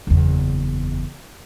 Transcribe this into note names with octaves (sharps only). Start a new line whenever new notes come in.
F#1 E2